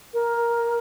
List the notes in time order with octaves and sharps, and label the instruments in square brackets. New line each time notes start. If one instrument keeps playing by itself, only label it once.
[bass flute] A#4